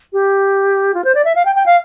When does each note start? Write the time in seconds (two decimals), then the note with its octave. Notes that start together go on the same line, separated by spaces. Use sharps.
0.13 G4
0.94 F4
1.04 C5
1.15 D5
1.25 E5
1.35 F5
1.45 G5
1.55 G5
1.66 F5